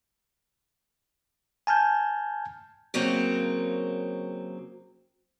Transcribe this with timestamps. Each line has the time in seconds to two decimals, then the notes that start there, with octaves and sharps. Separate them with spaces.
1.67 G#5 A5 F6 G6 G#6
2.94 C#3 F#3 A#3 C4